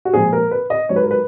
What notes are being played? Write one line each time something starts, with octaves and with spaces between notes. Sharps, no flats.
F#4
A#2 F3 G#3 G#4
A#4
B4
D#5
G#2 F#3 C#5
B4
A#4
B4